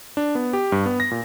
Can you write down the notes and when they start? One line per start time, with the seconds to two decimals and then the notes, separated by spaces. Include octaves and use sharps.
0.17 D4
0.35 B3
0.53 G4
0.72 G2
0.86 B3
1.00 A#6
1.11 A#2